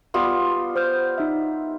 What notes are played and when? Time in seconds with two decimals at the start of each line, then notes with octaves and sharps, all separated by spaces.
0.14 G3 B3 F4
0.76 C5 F6 G6
1.18 D#4 E5